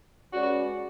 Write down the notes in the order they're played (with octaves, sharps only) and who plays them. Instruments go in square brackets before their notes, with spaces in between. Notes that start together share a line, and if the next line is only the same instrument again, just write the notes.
[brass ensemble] G#3 C#4 G#4 B4 D5 [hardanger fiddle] F#4